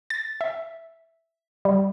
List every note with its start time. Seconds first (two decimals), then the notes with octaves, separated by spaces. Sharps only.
0.10 A6
0.41 E5
1.65 G3